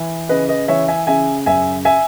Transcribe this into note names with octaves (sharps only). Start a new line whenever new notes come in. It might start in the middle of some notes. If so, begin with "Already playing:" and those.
Already playing: E3
C#3 B4 D#5
B4 D#5
E3 C#5 E5
E5 G#5
C#3 E5 G#5
F#2 E5 G#5
E5 G#5